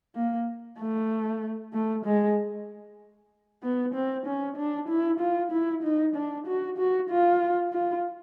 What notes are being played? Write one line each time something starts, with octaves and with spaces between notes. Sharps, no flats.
A#3
A3
A3
G#3
B3
C4
C#4
D4
E4
F4
E4
D#4
D4
F#4
F#4
F4
F4